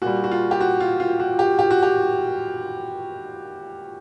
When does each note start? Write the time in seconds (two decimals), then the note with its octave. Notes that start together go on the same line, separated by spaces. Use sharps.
0.02 A#2 G3 F#4
0.24 F#4
0.31 F4
0.51 G4
0.61 F#4
0.80 F4
1.00 F4
1.20 F#4
1.39 G4
1.59 G4
1.71 F#4
1.83 G4